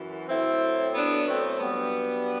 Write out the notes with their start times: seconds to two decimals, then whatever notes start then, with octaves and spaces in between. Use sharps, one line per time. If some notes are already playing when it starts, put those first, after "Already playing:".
Already playing: F#2 E3
0.28 A2 F#3 C4 E4
0.94 B3 D4
1.27 A3 C4
1.58 G2 F#3 G3 B3